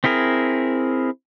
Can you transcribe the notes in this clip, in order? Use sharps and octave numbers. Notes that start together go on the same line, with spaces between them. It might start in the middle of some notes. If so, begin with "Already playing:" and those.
C4 E4 G#4 A#4